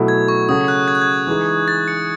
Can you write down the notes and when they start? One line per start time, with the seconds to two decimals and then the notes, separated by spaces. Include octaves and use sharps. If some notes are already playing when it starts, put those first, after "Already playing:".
Already playing: B2 F#3 A3 E4
0.08 G#6
0.28 C#6
0.49 C#3 F#3 C#4 F#4 A4 D#6
0.68 F#6
0.88 G#6
0.95 F#6
1.02 G#6
1.27 E3 G#3 D#4 G#4
1.68 A6
1.88 C#7